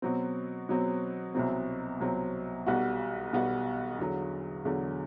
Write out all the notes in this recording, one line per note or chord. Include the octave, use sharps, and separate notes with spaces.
B2 F#3 C4
B2 F#3 C4
C2 B2 F#3 C4
C2 B2 F#3 C4
B1 B2 G3 B3 F#4
B1 B2 G3 B3 F#4
E2 D3 F#3
E2 D3 F#3